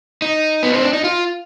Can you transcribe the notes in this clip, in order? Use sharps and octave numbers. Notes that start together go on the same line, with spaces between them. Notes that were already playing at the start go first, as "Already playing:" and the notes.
D#4
B3
C4
D4
D#4
F4